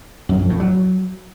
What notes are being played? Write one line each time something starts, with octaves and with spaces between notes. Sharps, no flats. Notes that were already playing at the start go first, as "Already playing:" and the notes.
F#2
F2
A2
F#3